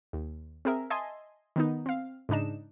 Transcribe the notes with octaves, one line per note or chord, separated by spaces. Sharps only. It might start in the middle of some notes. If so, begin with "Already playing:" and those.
D#2
C4 G#4 A#4 E5
D#5 E5 G#5 A5 C6
D#3 B3 D#4
C4 F5
G#2 C#3 D4 D#4 E7